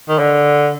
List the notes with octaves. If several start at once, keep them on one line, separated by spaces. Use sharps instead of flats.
D#3
D3